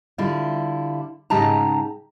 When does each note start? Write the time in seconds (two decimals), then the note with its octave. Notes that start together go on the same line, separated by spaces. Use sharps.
0.18 D3 G3 E4 F4
1.30 G#2 C#3 D#4 G4 A5 A#5